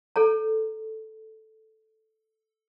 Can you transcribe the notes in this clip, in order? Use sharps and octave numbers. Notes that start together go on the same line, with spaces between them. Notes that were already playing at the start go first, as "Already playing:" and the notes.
A4 C#5 A#5